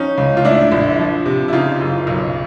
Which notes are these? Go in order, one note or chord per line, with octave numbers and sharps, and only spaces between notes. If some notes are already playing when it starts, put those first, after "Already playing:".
Already playing: F3 C#4 D#4
C#2
F4
A2 D4 E4
A#1
F3
C3
E4
C#3 D#4 F4
F#1
B1